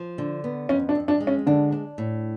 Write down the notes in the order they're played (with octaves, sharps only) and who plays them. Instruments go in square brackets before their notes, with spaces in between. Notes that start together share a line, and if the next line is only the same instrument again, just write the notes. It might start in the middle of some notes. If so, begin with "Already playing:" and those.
Already playing: [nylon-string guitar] F3
D3
B3
[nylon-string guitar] F2 [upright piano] C#4
[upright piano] D4
[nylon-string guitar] F2
[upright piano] D4
[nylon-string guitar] G#3
[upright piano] C#4
[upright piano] D3 [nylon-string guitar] D4
[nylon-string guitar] D4
A2